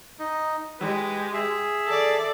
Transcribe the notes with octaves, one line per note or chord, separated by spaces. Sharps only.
D#4
G#3 G4 B4
G#4 E5
A4 D5